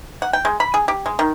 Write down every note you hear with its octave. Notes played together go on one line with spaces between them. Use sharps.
F#5
G5
G#3
B5
G#4
G4
G#3
D#3